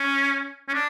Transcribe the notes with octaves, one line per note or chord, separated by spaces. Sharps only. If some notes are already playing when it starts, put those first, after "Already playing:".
Already playing: C#4
C#4
D4